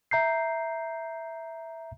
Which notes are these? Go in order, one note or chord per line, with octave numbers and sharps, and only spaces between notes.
E5 A#5 G6 C7